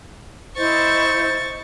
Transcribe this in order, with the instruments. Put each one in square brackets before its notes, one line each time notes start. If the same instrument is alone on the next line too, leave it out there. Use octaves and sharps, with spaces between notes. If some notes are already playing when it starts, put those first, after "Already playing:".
[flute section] E4 C5 D#5 [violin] C#6 A6